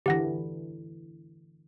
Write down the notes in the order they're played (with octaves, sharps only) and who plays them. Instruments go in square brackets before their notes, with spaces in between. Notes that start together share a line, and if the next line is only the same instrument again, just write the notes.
[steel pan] D3 E3 [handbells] G4 F#5 A#6